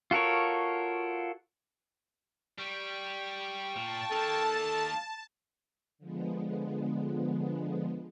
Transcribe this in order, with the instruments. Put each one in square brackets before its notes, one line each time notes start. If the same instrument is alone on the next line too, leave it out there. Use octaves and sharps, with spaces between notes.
[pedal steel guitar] F4 F#4 A4 A#4 C#5
[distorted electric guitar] G3 [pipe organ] G5 C#6
[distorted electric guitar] A#2 [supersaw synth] A5
[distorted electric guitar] D#3 A#3 [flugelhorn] A4
[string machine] D3 F3 G#3 B3